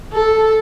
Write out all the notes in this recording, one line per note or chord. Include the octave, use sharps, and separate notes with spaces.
A4